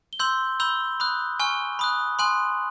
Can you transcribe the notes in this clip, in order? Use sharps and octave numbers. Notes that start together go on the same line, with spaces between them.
G7
C6 E6 G6 F#7
B5 E6 G6 G7
B5 D#6 F#6
G#5 C#6 F6 G7
B5 D#6 F#6
G#5 C6 D#6 F#6 F#7